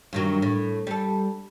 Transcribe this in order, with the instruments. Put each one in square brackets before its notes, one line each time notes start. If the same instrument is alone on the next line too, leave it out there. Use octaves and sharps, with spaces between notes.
[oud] G2 D#3 F#3
A2
G3 A4